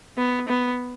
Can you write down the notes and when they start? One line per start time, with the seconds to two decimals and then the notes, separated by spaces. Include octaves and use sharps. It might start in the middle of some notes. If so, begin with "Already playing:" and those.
0.17 B3
0.48 B3